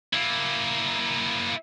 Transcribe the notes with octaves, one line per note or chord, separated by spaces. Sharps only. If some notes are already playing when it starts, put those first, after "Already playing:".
A#3 E4